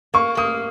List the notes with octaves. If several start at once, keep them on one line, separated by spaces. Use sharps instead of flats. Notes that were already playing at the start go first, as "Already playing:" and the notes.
A#3 C#6
A#3 D#6